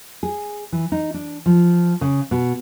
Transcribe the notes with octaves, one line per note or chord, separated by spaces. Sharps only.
G#4
E3
D#4
D4
F3
C#3
B2